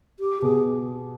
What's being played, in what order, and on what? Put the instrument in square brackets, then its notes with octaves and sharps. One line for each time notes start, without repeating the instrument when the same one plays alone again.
[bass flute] G4
[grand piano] B2 [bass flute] G#4